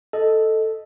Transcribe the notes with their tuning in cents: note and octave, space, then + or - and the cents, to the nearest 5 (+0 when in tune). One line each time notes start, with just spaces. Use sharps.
A4 +0 D#5 +0